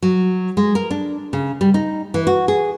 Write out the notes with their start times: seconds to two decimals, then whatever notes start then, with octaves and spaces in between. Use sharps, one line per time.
0.02 F#3
0.57 G#3
0.75 A#4
0.91 D4
1.33 C#3
1.61 G3
1.74 D#4
2.14 E3
2.27 F#4
2.48 G#4